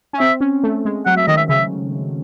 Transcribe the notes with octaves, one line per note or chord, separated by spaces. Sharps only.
C#4
C4 E5
C#4
A3
G#3
F#3 F#5
E5
D#3 D#5
E5
C#3 E5